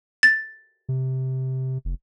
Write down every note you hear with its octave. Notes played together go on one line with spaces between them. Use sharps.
A6
C3
F1